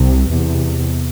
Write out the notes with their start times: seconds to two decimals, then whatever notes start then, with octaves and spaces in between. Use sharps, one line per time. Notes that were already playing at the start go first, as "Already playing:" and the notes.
Already playing: C2 C3
0.30 E2 C3